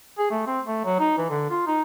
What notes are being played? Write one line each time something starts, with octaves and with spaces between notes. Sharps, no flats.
G#4
A3
C4
A3
F#3
D#4
E3
D3
F4
D#4